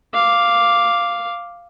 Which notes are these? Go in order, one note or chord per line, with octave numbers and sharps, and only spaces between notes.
F5 D6